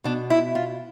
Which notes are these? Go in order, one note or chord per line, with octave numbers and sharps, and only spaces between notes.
B2 D4
E4
F4